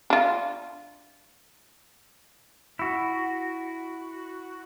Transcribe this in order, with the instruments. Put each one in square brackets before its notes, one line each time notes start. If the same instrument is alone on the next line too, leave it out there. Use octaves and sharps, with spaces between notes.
[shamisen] D4 F4
[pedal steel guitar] E4 F#4